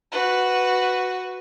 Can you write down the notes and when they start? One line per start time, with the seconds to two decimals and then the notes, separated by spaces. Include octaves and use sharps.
0.12 F#4 B4